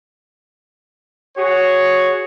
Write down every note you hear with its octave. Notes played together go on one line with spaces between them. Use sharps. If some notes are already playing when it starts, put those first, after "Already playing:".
F#4 G#4 C#5